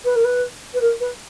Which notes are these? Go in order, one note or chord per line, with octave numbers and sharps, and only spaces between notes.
B4
A#4
B4
B4
A#4
B4